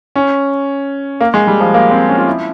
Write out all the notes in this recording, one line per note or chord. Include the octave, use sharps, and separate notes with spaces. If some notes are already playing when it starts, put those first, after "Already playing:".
C#4
A#3
G#3
G3
F3
A#3
C4
C#4
F4
E4